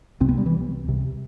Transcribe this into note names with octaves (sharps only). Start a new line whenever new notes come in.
C2 C3 C4
B3
G3
E3
C2 C3